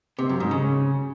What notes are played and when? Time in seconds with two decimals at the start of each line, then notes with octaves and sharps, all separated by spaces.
0.19 C3
0.29 F#2
0.40 G#2
0.51 C#3